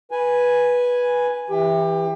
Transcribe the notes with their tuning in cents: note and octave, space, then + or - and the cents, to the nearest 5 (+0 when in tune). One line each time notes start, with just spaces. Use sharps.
B4 -10 G#5 +0
E3 +0 G4 +25